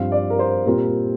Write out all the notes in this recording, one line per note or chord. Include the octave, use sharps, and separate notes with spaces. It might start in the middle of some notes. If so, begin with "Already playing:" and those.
Already playing: G2 F3 C4 F5
D5
A#4
C5
A#2 G3 C4 F4 A#4